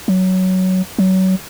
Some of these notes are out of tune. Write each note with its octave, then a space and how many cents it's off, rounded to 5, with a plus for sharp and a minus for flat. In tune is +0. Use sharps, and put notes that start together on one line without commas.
F#3 +10
F#3 +25